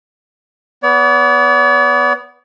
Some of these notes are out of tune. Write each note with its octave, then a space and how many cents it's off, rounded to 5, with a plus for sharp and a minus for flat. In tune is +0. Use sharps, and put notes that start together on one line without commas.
B3 +0 D5 -45